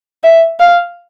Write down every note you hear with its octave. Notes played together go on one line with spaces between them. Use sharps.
E5
F5